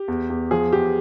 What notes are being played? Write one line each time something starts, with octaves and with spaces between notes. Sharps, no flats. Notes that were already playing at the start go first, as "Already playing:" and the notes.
Already playing: G4
E2
E2
F3 G#4
E2 G4